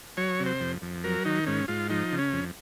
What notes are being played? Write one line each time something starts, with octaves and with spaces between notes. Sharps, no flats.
F#3 C#5
C3
C5
F2
F2
F#3 A#4
D#3 D#4
G#2 C#4
G#2 F4
F3 D#4
C#3
C#4
F2